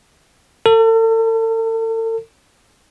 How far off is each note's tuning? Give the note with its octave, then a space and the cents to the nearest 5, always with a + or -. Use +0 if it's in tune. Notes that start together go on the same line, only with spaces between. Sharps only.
A4 +40